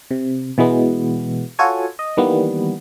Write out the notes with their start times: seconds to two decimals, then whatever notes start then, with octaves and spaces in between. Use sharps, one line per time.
0.11 C3
0.58 B2 E3 G#3 B3
1.59 F4 F#4 A4 C#5 G#5
1.99 D#5
2.17 D#3 E3 G3 A#3 B3